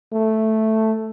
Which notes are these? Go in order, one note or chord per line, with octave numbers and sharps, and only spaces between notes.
A3